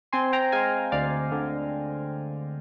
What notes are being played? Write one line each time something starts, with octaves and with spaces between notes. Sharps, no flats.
C4 G#5 C6
G5 A#5
G#3 F5 G#5
D2 D5 F5
D3